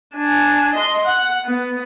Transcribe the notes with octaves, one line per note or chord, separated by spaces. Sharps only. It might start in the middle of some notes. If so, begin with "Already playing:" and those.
D4 G#5
D#5 C6
F#5
B3